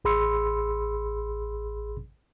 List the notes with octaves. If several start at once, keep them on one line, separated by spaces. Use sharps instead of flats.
A1 G#4 B5 C6 E6 C#7